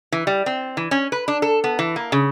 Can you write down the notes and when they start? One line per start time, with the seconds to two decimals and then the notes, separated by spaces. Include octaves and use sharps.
0.12 E3
0.27 G3
0.46 C4
0.77 E3
0.91 C#4
1.12 B4
1.28 D4
1.42 A4
1.64 B3
1.79 E3
1.96 A#3
2.12 C#3